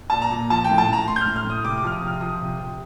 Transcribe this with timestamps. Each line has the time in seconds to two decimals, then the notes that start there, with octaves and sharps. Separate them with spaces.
0.10 A#2 A5
0.22 A#5
0.31 A#2
0.50 F3 A5
0.64 A2 G5
0.78 A5
0.89 A2 A#5
1.07 A2 C6
1.16 G6
1.21 F6
1.26 A2
1.36 F6
1.45 A2 D#6
1.64 C3 D6
1.78 D6
1.84 F3 F6
1.92 D#6
2.02 C3
2.07 F6
2.21 F3 D#6
2.41 C3
2.59 C3